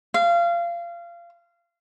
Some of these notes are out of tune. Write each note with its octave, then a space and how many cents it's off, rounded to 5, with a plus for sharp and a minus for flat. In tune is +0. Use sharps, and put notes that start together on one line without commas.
F5 -25